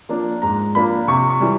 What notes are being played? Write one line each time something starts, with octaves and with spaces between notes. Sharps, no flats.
F3 A#3 D4
G#2 A#5
F3 A#3 D4 B5
C3 C#6
C#6
E3 G3